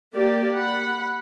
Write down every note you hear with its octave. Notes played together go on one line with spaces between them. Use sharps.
A#3 G4 D5
F#5 B5